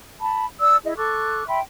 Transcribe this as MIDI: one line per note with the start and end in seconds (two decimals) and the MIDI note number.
0.20 0.44 81
0.20 0.44 83
0.59 0.78 74
0.59 0.78 87
0.59 0.78 88
0.84 0.93 64
0.84 0.93 68
0.84 0.93 75
0.84 0.93 76
0.96 1.45 69
0.96 1.45 85
0.96 1.45 86
0.96 1.45 90
1.47 1.60 76
1.47 1.60 79
1.47 1.60 83
1.47 1.60 84